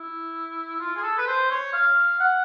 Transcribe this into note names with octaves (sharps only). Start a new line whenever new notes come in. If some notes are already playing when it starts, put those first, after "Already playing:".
Already playing: E4
F4
G#4
A4
B4
C5
C#5
F5
F#5